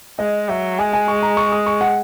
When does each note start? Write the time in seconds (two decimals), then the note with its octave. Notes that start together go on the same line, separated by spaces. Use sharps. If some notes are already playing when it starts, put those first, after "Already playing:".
0.19 G#3 D#5
0.49 F#3 E5
0.79 G#3 G#5
0.93 G#5
1.08 C#6
1.23 A#5
1.37 C#6
1.52 D#6
1.66 C#6
1.81 F#5